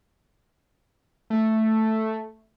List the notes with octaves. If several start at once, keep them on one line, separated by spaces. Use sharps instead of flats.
A3